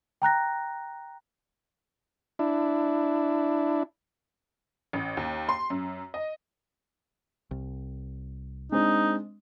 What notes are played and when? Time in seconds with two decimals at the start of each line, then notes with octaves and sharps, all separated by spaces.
0.22 G5 A#5 F#6 A#6
2.39 D4 E4
4.93 A1
5.17 D#2
5.49 C6
5.70 F#2
6.14 D#5
7.51 C2
8.72 G#3 C4 D4 D#4